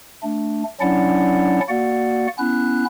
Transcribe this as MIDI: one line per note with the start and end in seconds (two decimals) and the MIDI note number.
0.23 0.63 57
0.23 0.63 62
0.81 1.60 54
0.81 1.60 61
0.81 1.60 62
0.81 1.60 64
0.81 1.60 74
0.81 1.60 78
1.69 2.27 58
1.69 2.27 66
1.69 2.27 74
1.69 2.27 78
2.38 2.85 59
2.38 2.85 61
2.38 2.85 64
2.38 2.85 90